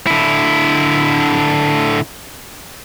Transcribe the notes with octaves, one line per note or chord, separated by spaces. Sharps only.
D3 E4